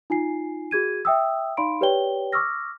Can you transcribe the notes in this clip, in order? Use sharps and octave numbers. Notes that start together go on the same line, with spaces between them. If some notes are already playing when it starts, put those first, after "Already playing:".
D#4 F4 G#5 C7
F#4 G#4 G#6 D#7
E5 G5 D#6 E6
D#4 D5 F5 B5 C6 D7
G4 B4 C#5 D5 G5 G7
C#6 D6 E6 F6 A#6